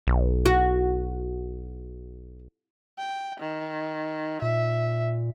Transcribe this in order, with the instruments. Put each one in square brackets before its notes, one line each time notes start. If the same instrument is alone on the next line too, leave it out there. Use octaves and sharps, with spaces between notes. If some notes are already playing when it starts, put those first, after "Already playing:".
[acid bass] B1
[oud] F#4
[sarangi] G5
D#3
[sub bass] A#2 [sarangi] E5